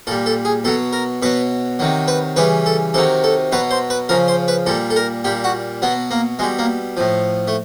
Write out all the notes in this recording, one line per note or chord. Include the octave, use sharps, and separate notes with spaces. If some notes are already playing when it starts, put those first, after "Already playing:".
A#2 G3 A4
A4
G#4
B2 F#3 A4
A#4
B2 F#3 B4
C3 D#3 F#3
B4
C#3 E3 G3 B4
A4
C3 D#3 F#3 A4
A4
B2 F#3 B4
C5
B4
C#3 F3 A#4
C5
B4
A#2 G3 A4
A4
A#4
A#2 G3 G4
F#4
B2 F#3 B3
A#3
B2 G3 G#3
A#3
A2 F3
A3